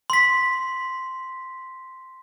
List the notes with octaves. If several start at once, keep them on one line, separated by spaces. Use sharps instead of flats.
C6 B6